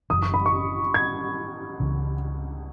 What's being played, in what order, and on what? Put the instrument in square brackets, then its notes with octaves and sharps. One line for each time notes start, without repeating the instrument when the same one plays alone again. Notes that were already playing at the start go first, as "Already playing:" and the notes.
[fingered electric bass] F#1 F#2 E3 [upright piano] D#6
[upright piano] C#6
B5
C#6
G#6
[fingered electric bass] C#2 C#3 E3